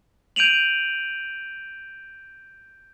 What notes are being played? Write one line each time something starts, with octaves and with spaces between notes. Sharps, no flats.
G6 D7 D#7 F7 F#7